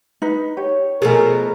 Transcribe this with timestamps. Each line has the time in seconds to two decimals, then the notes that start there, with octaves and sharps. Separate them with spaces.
0.22 D#4 B4
0.57 G4 C#5
1.02 B2 F3 A3 G#4 A#4 G#5